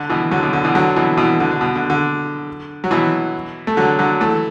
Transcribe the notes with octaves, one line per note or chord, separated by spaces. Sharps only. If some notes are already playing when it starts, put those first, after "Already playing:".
Already playing: D3
B2 E3
D3 F#3
B2
D3
B2 E3
D3 F#3
B2 E3
B2 E3
D3
D3
B2
D3
D3
F#3
B2 E3
A3
D3 F#3
D3 F#3
E3 A3